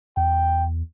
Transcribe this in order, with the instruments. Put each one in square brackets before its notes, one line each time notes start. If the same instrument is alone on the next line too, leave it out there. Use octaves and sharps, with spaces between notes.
[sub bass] E2 [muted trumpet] G5